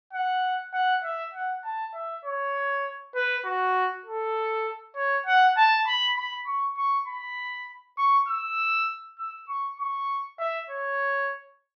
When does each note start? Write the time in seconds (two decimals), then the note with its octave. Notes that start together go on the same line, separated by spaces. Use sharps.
0.13 F#5
0.74 F#5
1.04 E5
1.34 F#5
1.64 A5
1.94 E5
2.25 C#5
3.15 B4
3.45 F#4
4.05 A4
4.96 C#5
5.26 F#5
5.57 A5
5.87 B5
6.17 B5
6.47 C#6
6.77 C#6
7.07 B5
7.98 C#6
8.28 E6
9.19 E6
9.49 C#6
9.80 C#6
10.39 E5
10.70 C#5